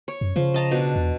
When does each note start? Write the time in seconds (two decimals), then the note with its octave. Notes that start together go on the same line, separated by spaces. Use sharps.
0.08 C#5
0.21 F#2
0.36 C#3 F3
0.54 D#5 A5 A#5
0.71 B2 D4
0.96 E2